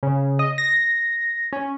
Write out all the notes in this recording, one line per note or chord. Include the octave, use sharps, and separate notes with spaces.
C#3
D#5
A#6
C#4